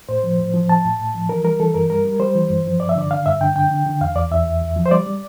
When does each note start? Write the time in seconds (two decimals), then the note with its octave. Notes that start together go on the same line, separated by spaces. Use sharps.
0.09 A2 C5
0.24 F3
0.38 A2
0.54 F3
0.69 A2 A5
0.85 A2
1.00 A2
1.14 F3
1.29 E3 A#4
1.44 G3 A#4
1.60 E3 A4
1.74 G2 A#4
1.90 G3 A#4
2.05 G3
2.19 G3 C5
2.35 E3
2.50 G2
2.66 F3
2.80 G2 D5
2.89 E5
2.95 D3 D5
3.11 D3 F5
3.26 G2 E5
3.41 D3 G5
3.56 D3 G5
3.71 D3
3.86 D3
4.01 E2 F5
4.16 E2 D5
4.32 E2 E5
4.47 E2
4.61 E2
4.76 F3
4.86 C5
4.91 G3 D5
5.06 G3